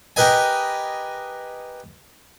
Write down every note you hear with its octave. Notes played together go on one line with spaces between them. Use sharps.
G4 A#4 B4 D#5 G#5